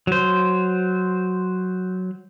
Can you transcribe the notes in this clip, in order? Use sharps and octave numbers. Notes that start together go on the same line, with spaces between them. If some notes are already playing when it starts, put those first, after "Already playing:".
F#3 C5